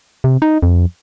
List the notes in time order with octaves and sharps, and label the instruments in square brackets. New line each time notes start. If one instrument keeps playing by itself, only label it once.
[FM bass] C3
D#4
F2